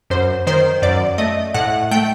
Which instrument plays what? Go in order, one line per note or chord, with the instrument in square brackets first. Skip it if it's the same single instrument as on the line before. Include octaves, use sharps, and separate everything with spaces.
[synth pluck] F#2 C5
D#3 C5
F#2 D5
A3 D#5
A2 F#5
A3 G5